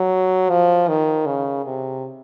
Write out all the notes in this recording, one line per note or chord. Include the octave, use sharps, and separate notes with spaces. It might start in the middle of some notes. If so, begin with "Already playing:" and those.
Already playing: F#3
F3
D#3
C#3
C3